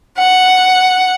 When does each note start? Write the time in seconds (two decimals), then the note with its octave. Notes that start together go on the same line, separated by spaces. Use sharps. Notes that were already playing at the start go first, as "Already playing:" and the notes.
0.17 F#5